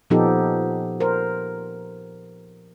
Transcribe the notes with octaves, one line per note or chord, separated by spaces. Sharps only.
A#2 F3 B3 D#4 G4 A4
A#4 C5